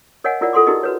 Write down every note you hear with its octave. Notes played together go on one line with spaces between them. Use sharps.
A#4 C#5 D#5 F5 F#5 G#5
E4 F4 A#4 D5 F#5
F4 A4 F#5 C6 D6
D#4 E4 F#4 G#4 A#4 D#5
F#4 B4 C#5